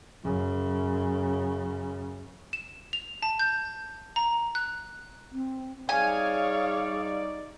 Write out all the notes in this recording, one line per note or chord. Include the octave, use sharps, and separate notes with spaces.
F#2 C#3
E7
F7
A5
G6
A#5
F#6
C4
G3 D#4 G#4 C#5 D5 F5 G#5